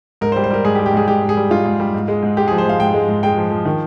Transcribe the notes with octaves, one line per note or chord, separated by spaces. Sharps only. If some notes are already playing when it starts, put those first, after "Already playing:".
G#2 A#4
C5
G3
C5
G3 A#4
G#2 G#4
G4
G3
G4
G#2 G#4
G#2 G4
G#2
G#4
G3
G#2 F4
G#2
G3
G#2
G#3
G#2
G#3 G4
G#4
F3
C5
G#2 F5
G#2 G5
G#3
G#2
G#3 G5
F3
F3
D#3